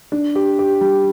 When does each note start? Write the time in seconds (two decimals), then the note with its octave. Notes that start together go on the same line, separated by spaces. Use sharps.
0.12 D4
0.35 G4
0.59 G4
0.81 G3